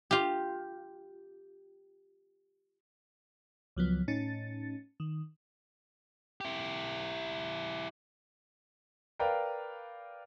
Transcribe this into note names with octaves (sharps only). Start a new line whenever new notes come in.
F4 G4
C#2 F3 F#3 B3
A2 C#4 D#4 A6
D#3
E4 G4
A#4 B4 D5 F5 G5